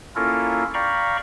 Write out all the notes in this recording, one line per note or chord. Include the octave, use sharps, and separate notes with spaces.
A#3 C#4 E4 F4 A4 A#4
D5 F5 G5 A#5 B5 C#6